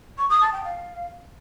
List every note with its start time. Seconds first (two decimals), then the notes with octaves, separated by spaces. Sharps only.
0.18 C#6
0.29 D#6
0.41 A5
0.52 G5
0.64 F5